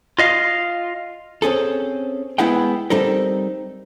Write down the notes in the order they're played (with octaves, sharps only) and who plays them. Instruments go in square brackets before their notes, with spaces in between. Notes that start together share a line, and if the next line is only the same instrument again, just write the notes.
[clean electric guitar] F4 D#5 F5
[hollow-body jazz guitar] C4 C#4 G#4 A4
G#3 B3 E4 G#4 F#5 G5
G3 C4 D#4 A4 A#4